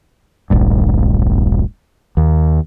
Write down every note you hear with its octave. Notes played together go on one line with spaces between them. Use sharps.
D1 A#1 G2
D#2